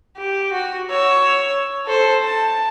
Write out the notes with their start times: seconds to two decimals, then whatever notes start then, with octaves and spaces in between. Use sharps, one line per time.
0.17 G4
0.52 F#4
0.90 C#5 E6
1.86 A4 C5
2.23 A5